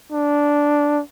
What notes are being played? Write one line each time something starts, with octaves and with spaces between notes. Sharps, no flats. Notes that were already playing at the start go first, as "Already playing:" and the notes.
D4